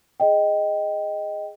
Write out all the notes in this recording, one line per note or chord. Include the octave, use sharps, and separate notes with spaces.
G#4 D#5 G5